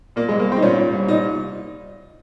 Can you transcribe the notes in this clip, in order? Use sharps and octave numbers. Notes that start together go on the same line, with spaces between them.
A#2 A#3
G#3
C2
A#3
C2 C4
D#4
A#2 C#4
A#2
C2
A#2 D#4